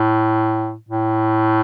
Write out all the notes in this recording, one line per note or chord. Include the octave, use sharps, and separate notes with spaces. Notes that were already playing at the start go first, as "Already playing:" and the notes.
Already playing: A2
A2